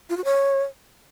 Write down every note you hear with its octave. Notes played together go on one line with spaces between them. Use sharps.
F4
F#4
C#5